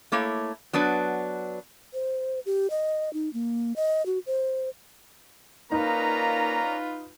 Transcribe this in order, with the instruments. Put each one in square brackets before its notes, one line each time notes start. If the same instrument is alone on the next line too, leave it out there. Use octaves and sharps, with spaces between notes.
[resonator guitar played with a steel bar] A3 A#3 E4 C#5
F#3 B3 D4 B4
[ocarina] C5
G4
D#5
D#4
A#3
D#5
F#4
C5
[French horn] A#3 [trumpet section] C#4 D5 A#5 [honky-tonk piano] D#4 [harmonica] F4 B4